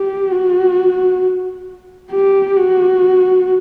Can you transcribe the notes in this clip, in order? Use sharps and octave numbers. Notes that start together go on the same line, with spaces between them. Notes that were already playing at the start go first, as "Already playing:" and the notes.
Already playing: G4
F#4
G4
F#4